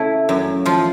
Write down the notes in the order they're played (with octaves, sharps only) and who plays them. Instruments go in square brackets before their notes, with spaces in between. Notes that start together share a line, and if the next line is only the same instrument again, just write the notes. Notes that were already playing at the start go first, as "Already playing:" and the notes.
Already playing: [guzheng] C#3 A3 E4
F#2
F3 F4